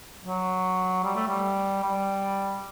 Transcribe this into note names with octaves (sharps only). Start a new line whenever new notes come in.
F#3
G3
A3
G3
G3